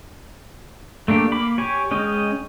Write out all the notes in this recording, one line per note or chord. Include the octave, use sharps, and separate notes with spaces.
A3 A#3 D4 G4
A#3 B5 D6
G4 C#5 G#5
G#3 C#4 D#5 G5